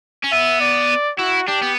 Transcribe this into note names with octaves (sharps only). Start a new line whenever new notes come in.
C#4
B3 E5
D5
E4 F#4
D4 G4
B3